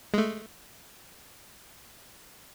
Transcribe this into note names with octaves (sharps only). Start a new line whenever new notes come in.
G#3 A3